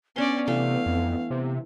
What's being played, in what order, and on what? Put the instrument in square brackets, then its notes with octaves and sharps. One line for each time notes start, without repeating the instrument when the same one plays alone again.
[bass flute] B3 [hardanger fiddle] C#4 D5 [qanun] D4 C6
[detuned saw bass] C3 [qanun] E3 A3 [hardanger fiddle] F5
[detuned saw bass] F2
C3